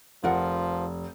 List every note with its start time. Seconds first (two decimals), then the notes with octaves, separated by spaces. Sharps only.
0.24 F1 F3 F4 A#4 F#5